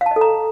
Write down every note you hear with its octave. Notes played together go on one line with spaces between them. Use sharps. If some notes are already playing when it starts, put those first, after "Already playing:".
F5
A5
D#5
A4
A#5